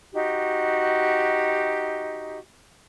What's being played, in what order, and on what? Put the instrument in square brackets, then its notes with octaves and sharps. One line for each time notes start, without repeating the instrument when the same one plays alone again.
[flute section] D#4 F#4 G4